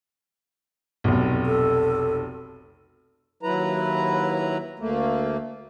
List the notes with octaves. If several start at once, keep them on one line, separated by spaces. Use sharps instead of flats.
F1 B1
A4
D#2 F#3 E4 B4 A#5
D2 A3 A#3